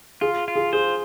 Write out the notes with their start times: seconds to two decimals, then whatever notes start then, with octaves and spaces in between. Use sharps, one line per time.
0.21 F4 G#4
0.48 F4
0.55 G#4
0.73 G#4 C5